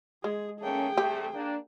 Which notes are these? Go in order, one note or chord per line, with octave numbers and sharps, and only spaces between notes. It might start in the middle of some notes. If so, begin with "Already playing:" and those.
G#3 G#4
A3 A#3 C#4 G#4 G5
C3 G3 A3 G4
A#3 D4